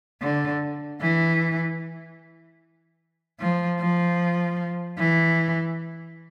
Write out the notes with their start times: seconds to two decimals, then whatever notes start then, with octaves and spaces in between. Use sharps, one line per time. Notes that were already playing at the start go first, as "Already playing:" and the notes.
0.22 D3
1.01 E3
3.40 F3
3.80 F3
4.98 E3